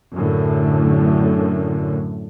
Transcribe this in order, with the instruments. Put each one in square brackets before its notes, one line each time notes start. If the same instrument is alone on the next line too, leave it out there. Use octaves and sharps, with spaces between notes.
[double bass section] F#2 A2 D3